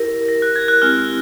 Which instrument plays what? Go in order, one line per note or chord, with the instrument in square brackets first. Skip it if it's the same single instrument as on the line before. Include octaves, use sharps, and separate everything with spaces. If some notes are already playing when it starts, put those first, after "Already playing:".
Already playing: [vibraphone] E4 G4 A#4
[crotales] A#6
F#6
G#6
F#6
[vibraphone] G#3 C4 E4 G4 [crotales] F6